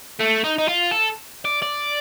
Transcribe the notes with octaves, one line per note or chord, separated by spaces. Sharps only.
A3
D#4
D#4
F4
A4
D5
D5